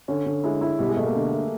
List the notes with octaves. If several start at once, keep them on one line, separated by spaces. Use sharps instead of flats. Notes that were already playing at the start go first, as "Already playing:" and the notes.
D3 C#4
D3
G#3 E4
E4
B2 G3
G#3
B2 A3
A#3
D3
A3